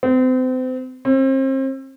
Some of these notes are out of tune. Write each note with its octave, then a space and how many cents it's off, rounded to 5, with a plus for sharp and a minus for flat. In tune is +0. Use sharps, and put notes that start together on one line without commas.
C4 -35
C4 +35